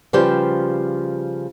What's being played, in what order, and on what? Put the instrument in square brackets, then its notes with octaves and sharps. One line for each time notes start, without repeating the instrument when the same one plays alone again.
[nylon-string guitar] C#3 F3 G3 G4 B4 C5